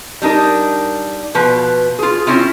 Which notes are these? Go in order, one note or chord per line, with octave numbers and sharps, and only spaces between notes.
G3 D4 D#4 A#4
B2 F3 B4
F4 G#4
C4 C#4 E4 F4